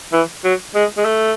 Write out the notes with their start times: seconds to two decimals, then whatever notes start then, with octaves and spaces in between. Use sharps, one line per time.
0.13 E3
0.44 F#3
0.75 G#3
0.97 G#3
1.05 A3